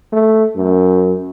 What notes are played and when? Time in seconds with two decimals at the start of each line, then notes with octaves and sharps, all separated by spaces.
0.13 A3
0.56 F#2